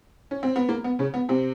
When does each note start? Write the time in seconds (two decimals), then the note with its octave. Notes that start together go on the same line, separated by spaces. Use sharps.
0.31 C#4
0.43 C4
0.56 B3
0.69 A#3
0.84 B3
0.99 C#3 C#4
1.14 B3
1.29 C3 C4